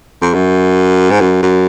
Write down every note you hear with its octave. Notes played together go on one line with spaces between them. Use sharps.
F2
F#2
G#2
F#2
F#2